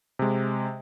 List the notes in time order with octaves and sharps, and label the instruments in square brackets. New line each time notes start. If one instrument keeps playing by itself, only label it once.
[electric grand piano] C3 G#3